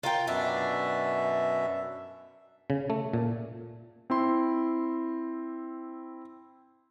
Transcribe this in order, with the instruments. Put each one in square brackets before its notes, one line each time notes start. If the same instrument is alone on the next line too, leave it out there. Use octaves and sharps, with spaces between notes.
[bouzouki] F4 A#4 G5
[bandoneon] F#2 B2 E5 [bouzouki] D4
[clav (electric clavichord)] C#3
A3
A#2
[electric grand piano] C4 E4 C6